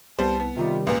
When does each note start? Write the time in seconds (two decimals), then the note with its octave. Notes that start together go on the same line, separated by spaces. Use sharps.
0.19 C2 G3 B3 C5 A5
0.40 B3
0.56 C3 D#3 G3 F4
0.87 C#2 A#2 B4